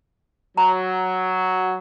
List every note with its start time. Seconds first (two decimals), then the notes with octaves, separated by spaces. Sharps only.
0.57 F#3 A#5